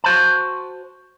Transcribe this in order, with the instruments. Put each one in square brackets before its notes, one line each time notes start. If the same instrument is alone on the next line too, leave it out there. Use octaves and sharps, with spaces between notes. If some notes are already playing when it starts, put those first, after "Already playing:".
[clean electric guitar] F#4 C5 A5